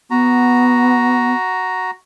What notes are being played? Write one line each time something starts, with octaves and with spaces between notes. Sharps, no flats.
B3 F#4 A#5